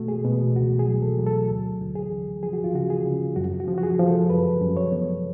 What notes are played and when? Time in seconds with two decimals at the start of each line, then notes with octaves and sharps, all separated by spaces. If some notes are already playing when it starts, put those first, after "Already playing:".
Already playing: B2 A3 F#4
0.08 G#4
0.24 B2
0.55 C#2 F#4
0.79 G#4
0.86 F#3
1.02 A4
1.19 F#3
1.26 A4
1.50 D2
1.81 D2
1.95 G#4
2.12 D2
2.43 F3 G#4
2.53 F#4
2.64 F4
2.74 C#3 F#4
2.90 G#4
3.06 C#3
3.36 F#2 F#4
3.60 F#4
3.68 F3
3.78 F#4
3.83 G#4
3.99 F3
4.07 A4
4.30 F#2 B4
4.61 F#2
4.77 C#5
4.92 B3